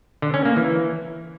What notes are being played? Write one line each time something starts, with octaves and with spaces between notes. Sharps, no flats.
D3
C#4
A#3
E3